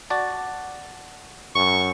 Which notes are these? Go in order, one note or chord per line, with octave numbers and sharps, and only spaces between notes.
F#4 D5 A5
F#2 C#6